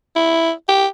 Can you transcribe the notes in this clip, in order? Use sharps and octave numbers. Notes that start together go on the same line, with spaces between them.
E4
G4